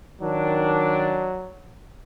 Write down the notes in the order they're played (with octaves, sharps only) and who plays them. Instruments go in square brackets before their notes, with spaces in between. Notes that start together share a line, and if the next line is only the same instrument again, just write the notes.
[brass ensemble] D#3 D4 [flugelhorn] F#3